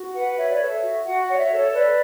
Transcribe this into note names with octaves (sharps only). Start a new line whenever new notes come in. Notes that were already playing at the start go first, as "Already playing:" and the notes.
Already playing: F#4
B4 F#5
C#5 E5
D5
A4 E5
F#4
F#4 F#5
F#5
C#5
D5
E5
A4
C#5
B4 D5